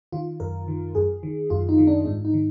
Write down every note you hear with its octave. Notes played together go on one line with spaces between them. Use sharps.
D#3 F4
F#2 A#4
D#3
F#2 G#4
D#3
F#2 F4
D#4
D#3
D4
G#2 D4
D#4
D#3